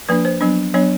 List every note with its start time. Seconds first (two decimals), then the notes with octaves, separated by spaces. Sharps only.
0.09 F3 A#3 D4 B4
0.25 C5
0.41 F#3 B3 D4
0.74 F#3 B3 D4 C#5